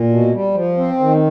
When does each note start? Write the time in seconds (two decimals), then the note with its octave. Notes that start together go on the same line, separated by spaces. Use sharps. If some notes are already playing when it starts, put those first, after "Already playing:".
Already playing: A#2
0.09 B2
0.32 G3
0.54 F3
0.77 C4
1.00 D#3